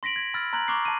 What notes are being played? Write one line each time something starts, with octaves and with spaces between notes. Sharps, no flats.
C6 A#6 B6 D7 F#7
G#6
B5 E6 F6 A6
A#5 C6 F#6 G#6 F#7
A#5 C#6 D6 F#6 C7
A5 D#7